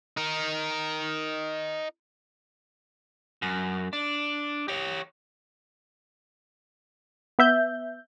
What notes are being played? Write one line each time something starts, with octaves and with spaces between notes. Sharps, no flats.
D#4 A#4
F#2
D4
G4 C#5
B3 E5 G6